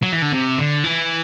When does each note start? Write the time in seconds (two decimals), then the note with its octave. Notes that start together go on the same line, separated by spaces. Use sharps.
0.03 F#3
0.12 E3
0.22 D3
0.33 C3
0.58 D3
0.84 E3